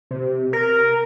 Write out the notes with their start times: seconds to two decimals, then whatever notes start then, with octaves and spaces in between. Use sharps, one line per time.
0.11 C3
0.53 A#4